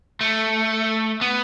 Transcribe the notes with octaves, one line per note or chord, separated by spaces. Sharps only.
A3
B3